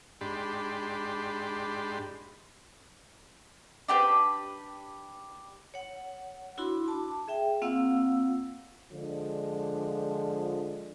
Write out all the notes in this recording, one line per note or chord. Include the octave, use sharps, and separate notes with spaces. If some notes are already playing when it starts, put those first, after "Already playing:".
G#2 D4 G4 B5 C6
D4 G4 B4
C#5 F#5
D4 E4 F#4 B5 C6
A5 D6
G#4 E5 G5
A#3 C4 F4 F5 F#5 E6
D3 F3 G#3 D4